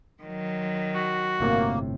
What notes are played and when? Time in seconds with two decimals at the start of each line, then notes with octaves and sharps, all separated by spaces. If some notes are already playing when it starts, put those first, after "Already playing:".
0.23 D#3 F#3
0.95 F#4
1.40 G1 A2 C3 A#3